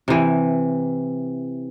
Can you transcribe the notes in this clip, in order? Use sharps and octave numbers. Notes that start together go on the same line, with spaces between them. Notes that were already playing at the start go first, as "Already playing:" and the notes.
C3 E3